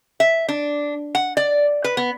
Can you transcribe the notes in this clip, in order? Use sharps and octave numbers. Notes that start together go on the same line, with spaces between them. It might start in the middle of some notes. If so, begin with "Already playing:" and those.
E5
D4
F#5
D5
B4
B3